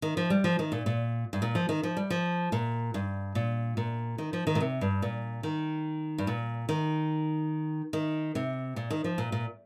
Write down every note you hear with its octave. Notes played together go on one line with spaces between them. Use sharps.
D#3
F3
G3
F3
D#3
A#2
A#2
G2
A#2
F3
D#3
F3
G3
F3
A#2
G2
A#2
A#2
D#3
F3
D#3
A#2
C3
G2
A#2
D#3
G2
A#2
D#3
D#3
C3
A#2
D#3
F3
A#2
A#2